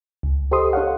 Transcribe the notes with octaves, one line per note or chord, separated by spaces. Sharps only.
C#2
G4 A4 C5 D#5 C6 D#6
D#4 A4 C#5 F5 F#5